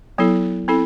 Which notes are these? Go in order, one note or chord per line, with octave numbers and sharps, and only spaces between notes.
F#3 B3 E4 A4
C4 E4 A4